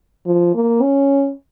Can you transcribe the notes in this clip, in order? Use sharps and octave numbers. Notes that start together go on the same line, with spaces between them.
F3
A#3
C#4